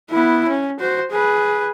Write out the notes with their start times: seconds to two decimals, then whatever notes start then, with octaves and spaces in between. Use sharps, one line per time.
0.10 B3 E4
0.48 C#4
0.80 F#4 C5
1.11 G#4 B4